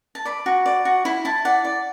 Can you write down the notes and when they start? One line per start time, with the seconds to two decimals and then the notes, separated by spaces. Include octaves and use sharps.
0.15 A5
0.25 D5 B5
0.46 F#4
0.66 D5
0.85 F#4
1.05 E4 B5
1.25 E4 A5
1.45 D5 F#5
1.65 D5